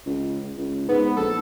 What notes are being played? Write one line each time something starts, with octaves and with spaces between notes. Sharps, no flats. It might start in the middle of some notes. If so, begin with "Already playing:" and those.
C#2
C#2
G#2 B3
A#1 A4